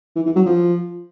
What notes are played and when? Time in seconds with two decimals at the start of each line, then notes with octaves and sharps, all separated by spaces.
0.16 E3
0.26 E3
0.36 F#3
0.46 F3